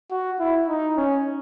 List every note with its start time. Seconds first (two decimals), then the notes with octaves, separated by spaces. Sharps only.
0.11 F#4
0.39 E4
0.68 D#4
0.97 C#4